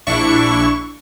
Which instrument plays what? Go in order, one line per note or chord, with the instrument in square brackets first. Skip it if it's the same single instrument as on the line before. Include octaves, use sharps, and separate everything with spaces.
[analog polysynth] A#1 D4 E4 C#6